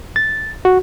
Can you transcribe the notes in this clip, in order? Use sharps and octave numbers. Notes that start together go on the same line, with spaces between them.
A6
F#4